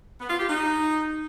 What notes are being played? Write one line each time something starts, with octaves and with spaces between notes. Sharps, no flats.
B3
F4
G4
D#4